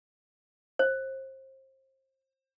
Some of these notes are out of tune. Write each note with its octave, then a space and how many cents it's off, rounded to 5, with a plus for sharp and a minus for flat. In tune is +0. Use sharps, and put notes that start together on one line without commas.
C5 +30